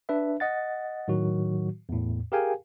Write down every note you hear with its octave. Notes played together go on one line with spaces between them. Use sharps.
D4 B4 E5
D#5 F#5 A6
A2 D#3 F#3 F#4
E2 A2
G4 G#4 A#4 F5 G5 G#5